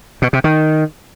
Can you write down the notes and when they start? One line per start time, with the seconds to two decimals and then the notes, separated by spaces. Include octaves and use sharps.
0.22 B2
0.33 C3
0.44 D#3